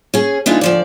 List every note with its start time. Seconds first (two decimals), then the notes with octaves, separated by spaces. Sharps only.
0.14 C#4 G#4
0.46 E3 G#3 D4 D#4 F4
0.61 D2 F3 D5